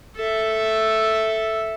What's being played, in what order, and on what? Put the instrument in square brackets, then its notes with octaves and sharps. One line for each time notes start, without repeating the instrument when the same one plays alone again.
[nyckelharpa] A4 E5